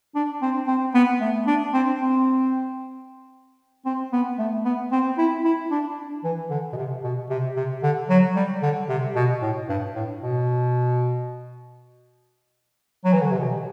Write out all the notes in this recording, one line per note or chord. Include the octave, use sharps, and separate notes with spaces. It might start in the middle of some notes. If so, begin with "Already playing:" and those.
D4
C4
C4
B3
A3
D4
C4
C4
C4
B3
A3
B3
C4
E4
E4
D4
E3
D3
B2
C3
B2
C3
C3
D3
F#3
G3
D3
C3
B2
A2
G2
A2
B2
F#3
E3
D3
C3
B2